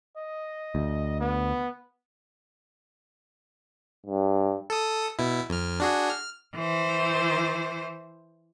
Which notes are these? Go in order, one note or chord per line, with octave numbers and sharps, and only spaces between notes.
D#5
D2
B3
G2
A4 D#6
B2 E4
F2 F6
D4 F#4 G#4
F6
E3 C5